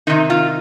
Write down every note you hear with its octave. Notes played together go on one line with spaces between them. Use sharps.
C3 D#3 D#4
F4